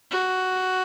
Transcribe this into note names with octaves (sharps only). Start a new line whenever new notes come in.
F#4